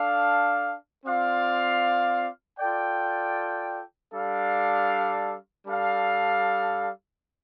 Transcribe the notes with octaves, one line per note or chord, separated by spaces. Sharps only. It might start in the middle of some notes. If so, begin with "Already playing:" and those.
Already playing: D4 A4 F5
C4 F4 D5 F5
F4 A4 D5 G5
G3 D4 A4 F5
G3 D4 A4 F5